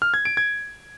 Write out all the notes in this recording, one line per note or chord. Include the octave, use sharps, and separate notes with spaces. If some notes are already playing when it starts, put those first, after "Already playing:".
F6
G#6
D7
G#6